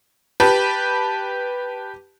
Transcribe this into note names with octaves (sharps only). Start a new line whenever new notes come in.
G4 B4 A5